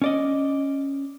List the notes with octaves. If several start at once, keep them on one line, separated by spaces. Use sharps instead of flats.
C#4 D5 D#5